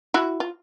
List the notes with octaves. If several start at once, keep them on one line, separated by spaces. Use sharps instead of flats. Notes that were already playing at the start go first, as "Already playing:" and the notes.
E4 F#4
F4